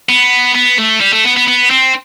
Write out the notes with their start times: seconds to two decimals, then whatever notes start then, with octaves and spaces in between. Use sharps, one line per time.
0.09 B3
0.55 B3
0.78 A3
1.01 G3
1.13 A3
1.25 B3
1.37 B3
1.48 B3
1.70 C4